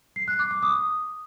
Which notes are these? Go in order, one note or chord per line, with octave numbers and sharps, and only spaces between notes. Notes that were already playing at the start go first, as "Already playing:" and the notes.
C7
F#6
D6
D6
D#6